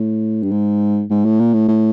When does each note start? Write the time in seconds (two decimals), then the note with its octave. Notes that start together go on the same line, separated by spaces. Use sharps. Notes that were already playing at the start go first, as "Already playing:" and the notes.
Already playing: A2
0.43 G2
0.51 G#2
1.10 G#2
1.25 A2
1.40 A#2
1.54 A2
1.69 A2